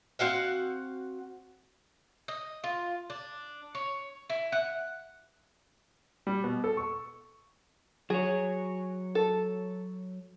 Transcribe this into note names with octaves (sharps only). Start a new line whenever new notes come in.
C4 F#4 F5 F#5
D#5
F4
D4
C#5
E4
F#5
G3
B2
A4
C#6
F#3 G#4 C#5
A4